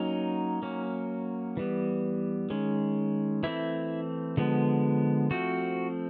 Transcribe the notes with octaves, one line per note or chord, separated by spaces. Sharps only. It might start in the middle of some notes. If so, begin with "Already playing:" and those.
Already playing: F#3 A#3 C#4 D#4
F#3 A#3 C#4
E3 G3 B3
D#3 G#3 C#4
E3 A3 C4 E4
D3 F3 G#3 B3
F3 A3 C4 F#4